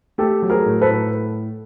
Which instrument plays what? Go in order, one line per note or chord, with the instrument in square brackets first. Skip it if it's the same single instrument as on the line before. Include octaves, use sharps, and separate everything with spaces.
[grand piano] A3 [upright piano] G4 A4
[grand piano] F#3
[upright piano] G#4 A#4
[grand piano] A2
[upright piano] A4 B4
[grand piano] A2